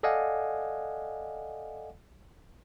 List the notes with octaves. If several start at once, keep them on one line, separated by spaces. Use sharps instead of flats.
A4 D5 D#5 F5 F#5 G#5